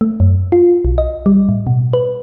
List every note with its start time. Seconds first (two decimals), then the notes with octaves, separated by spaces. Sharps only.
0.01 A3
0.20 F#2
0.52 F4
0.85 B1
0.98 D#5
1.26 G3
1.49 A2
1.67 B2
1.93 B4